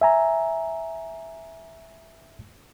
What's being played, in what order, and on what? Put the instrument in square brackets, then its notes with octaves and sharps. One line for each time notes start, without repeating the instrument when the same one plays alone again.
[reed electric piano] E5 G#5 A#5